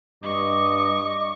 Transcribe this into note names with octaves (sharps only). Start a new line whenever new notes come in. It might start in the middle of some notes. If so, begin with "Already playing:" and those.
G2 D#5 C#6 D6